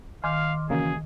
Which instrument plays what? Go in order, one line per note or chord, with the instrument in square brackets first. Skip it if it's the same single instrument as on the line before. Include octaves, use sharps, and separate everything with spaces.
[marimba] D#3 [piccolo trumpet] F5 [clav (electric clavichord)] G#5 [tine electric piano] C6 D6 F6
[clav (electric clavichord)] C#3 A#3 [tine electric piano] E3 C#4 F#4 [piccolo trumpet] G#4